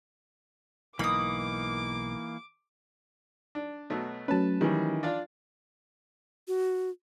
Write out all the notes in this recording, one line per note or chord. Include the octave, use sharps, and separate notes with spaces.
B1 G#2 E3 A#3 D#4 B5 D6 D#6
D4
B2 F#3 A3
F#3 A3 C#4 B4 A5
D#3 E3 G3
D4 F4 D5
F#4